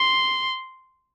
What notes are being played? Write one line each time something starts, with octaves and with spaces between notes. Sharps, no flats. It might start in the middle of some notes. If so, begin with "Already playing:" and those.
Already playing: C6